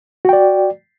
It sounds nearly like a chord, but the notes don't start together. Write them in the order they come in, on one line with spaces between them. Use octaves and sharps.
F#4 G5 D5